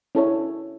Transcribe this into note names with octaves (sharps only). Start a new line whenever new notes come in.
C#4 E4 A4 C#5